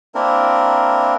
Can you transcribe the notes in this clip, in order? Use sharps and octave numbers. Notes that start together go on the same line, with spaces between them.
A#3 C4 D4 E4 A#4